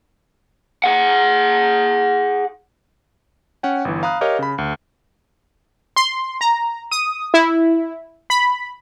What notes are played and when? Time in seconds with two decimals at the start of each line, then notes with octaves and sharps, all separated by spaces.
0.84 G#4 F#5
3.63 C#4 F#5 G5
3.85 G1 E3
4.03 F5 A#5 B5 D#6 F#6
4.21 G4 A#4 C#5 D#5 F5
4.39 C#3 B5
4.58 D2
5.96 C6
6.41 A#5
6.91 D#6
7.34 E4
8.30 B5